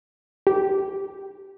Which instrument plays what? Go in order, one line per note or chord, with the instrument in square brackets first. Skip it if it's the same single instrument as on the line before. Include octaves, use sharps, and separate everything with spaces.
[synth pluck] G4